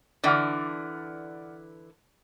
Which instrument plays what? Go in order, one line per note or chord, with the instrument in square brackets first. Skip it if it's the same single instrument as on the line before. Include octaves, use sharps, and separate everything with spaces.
[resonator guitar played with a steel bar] D3 E3 [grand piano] D5 F#5 F6